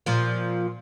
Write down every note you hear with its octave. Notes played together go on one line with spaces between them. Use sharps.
A#2 F3